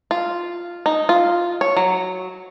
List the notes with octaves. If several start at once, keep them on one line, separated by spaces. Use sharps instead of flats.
F4
D#4
F4
C#5
F#3